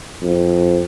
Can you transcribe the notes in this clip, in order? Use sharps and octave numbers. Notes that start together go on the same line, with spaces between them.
F2